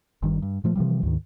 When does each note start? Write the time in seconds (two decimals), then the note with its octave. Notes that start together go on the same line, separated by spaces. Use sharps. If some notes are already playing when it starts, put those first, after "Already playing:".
0.22 G1 G2 D#3 G3
0.42 G2
0.64 A#2 F3 A3
0.76 C3 E3 F3 G3
1.03 D2 G#2 D#3